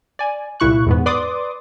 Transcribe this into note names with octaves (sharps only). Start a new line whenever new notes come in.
D5 G#5
C2 A#2 E4 C#6 F#6
E2 G#2 B3
B4 D5 C6 D6 D#6